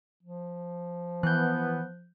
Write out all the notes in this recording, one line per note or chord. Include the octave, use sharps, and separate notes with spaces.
F3
E3 B3 F#6 G6